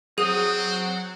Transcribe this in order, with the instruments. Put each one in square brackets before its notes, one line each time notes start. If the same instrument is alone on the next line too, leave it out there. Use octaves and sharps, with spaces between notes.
[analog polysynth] F#3 F#5 [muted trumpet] C4 [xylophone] G#4 [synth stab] D#6